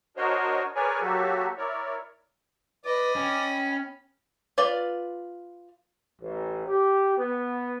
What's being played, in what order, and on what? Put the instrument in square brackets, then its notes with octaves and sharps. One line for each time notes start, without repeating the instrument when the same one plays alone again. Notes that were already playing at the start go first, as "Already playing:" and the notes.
[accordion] D4 F#4 A#4 C5 C#5 D#5
G#4 A#4 B4 C#5 D5 G#5
F#3 A#3 F#4 G4 A4
E4 A#4 C#5 D5
[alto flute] B4 [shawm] D5 [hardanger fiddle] D#5 B5
[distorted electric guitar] C#4 [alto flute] G5
[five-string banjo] F4 B4 D5 F5
[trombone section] A1
G4
B3